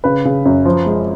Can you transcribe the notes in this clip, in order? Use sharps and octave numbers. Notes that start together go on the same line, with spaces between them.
C#3 B4
C#3
F#2
F3
G#3